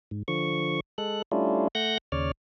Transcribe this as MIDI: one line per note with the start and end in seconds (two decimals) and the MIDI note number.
0.11 0.23 44
0.28 0.80 50
0.28 0.80 53
0.28 0.80 85
0.98 1.22 56
0.98 1.22 69
0.98 1.22 90
1.32 1.68 55
1.32 1.68 57
1.32 1.68 61
1.32 1.68 62
1.32 1.68 64
1.32 1.68 65
1.75 1.98 57
1.75 1.98 78
1.75 1.98 90
1.75 1.98 91
1.75 1.98 94
2.12 2.31 39
2.12 2.31 49
2.12 2.31 73
2.12 2.31 74
2.12 2.31 89